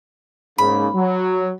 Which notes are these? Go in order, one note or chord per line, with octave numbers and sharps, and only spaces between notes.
G#2 C#3 A#3 B5
F#3